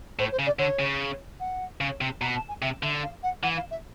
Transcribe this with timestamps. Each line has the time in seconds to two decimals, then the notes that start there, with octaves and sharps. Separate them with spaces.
0.19 A2 C5
0.32 C5
0.39 C#3
0.46 D5
0.59 D3 C#5
0.79 C#3
1.40 F#5
1.81 C#3
2.01 C3
2.21 B2 A#5
2.35 A5
2.48 G#5
2.62 C3 E5
2.83 D3 E5
3.03 F5
3.23 F#5
3.43 E3 F#5
3.57 F5
3.71 E5